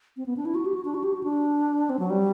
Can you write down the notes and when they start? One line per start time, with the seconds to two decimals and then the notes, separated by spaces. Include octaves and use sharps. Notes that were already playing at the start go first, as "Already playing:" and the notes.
0.17 C4
0.26 B3
0.37 D4
0.45 E4
0.55 F#4
0.66 G4
0.74 F#4
0.85 D4
0.94 F#4
1.04 G4
1.14 F#4
1.23 D4
1.90 C4
1.99 F#3
2.10 G3